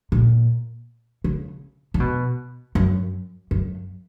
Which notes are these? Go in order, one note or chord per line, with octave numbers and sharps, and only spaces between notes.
A#2
C#3
C#3
B2
F#2
F#2